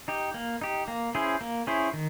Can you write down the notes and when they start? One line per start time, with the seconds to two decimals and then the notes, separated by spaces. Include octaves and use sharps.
0.08 D#4 G4
0.34 A#3
0.61 D#4 G4
0.88 A#3
1.15 C#4 E4 G#4 C5
1.41 A#3
1.67 C#4 E4 G#4 C5
1.93 D#3